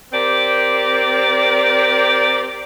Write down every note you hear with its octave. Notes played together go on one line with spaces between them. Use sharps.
C4 G4 A#4 D5